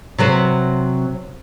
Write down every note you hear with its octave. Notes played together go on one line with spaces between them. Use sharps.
C3 F#3 B4 C5